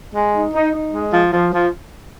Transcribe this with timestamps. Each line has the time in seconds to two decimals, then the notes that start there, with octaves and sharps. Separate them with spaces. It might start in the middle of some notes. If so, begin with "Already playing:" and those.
0.15 G#3
0.34 D#4
0.54 D#4
0.74 D#4
0.94 G#3
1.13 F3
1.33 F3
1.53 F3